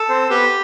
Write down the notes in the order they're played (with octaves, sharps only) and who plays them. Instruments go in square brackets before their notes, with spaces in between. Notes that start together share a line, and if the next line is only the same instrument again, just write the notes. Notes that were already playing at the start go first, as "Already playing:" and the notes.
Already playing: [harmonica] A4
[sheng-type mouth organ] C4 C5
[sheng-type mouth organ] B3 B4 [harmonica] G4